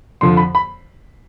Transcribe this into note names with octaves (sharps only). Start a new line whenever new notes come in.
F2 D3 F3 C6
B5
B5